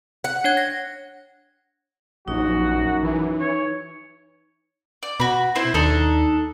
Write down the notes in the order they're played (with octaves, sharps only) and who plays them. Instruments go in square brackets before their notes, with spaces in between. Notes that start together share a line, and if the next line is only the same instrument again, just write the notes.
[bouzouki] F#5
[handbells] D4 C#5 G#6
A#6
[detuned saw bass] A#1 [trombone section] F#2 [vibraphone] D#4 [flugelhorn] F#4
[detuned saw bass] E3
[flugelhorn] C#5
[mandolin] D5
[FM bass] B2 [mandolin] F#4 B5
[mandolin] C4 E4 C5
[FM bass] D#2 [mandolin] D4 D#4 A4